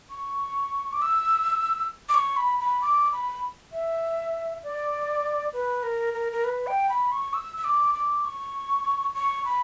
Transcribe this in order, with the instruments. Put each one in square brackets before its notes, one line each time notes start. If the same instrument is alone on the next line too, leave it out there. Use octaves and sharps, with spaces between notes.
[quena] C#6
D6
E6
D6
C#6
B5
B5
D6
B5
E5
D5
B4
A#4
A#4
A#4
B4
G5
B5
C#6
E6
E6
D6
D6
C#6
C#6
B5